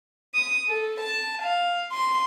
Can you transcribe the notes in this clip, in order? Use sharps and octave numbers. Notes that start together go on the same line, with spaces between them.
D#6
A4
A5
F5
C6